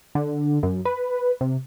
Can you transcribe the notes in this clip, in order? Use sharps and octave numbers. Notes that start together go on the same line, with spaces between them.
D3
F#2
B4
C3